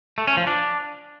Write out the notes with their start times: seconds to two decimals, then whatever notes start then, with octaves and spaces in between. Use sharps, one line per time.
0.18 A3
0.27 C#4
0.37 F3
0.47 D4